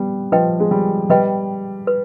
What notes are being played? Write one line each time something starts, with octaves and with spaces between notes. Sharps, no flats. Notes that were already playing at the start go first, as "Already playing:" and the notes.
Already playing: G3 B3
F3 B4 D#5 G5
G#3
G3
G3 B4 D#5 G5
B4